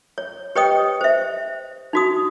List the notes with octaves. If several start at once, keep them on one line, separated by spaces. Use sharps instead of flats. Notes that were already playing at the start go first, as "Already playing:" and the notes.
C#5
G4 B4 C#5 D#5 G5 D#6
C5 E5
D#4 F#4 D#6